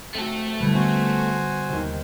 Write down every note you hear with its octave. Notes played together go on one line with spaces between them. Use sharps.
A3 C4 F#4 A4
B2 D3 G3 E4 B4
B3 F#4 C5 G#5
D#2 C3